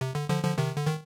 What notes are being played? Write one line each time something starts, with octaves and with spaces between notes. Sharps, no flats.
C3
D3
D3 F3
D3 F3
C3 D#3
D3
D#3